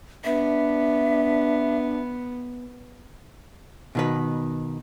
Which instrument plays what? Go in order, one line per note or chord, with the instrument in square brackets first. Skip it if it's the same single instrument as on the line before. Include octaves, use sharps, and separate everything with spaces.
[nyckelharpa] B3 [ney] D4 [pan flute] E5
[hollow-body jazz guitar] B2 D#3 B4